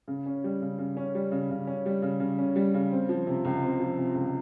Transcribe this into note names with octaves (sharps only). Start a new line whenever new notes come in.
C#3
C#4
G3
C#3
C#3
C#4
G3
C#3
C#3
C#4
G3
C#3
C#3
C#4
G3
C#3
C4
F3
C3
C#2
C4
F3
C3
C#2